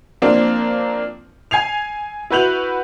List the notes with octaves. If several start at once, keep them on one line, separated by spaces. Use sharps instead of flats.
F3 A#3 C4 D4
G#5 G#6 C7 F7
E4 F#4 B4 G6 F7 F#7